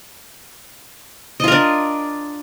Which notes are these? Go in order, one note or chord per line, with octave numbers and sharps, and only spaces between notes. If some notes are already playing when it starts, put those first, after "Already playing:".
D4 F4 A#4 D#5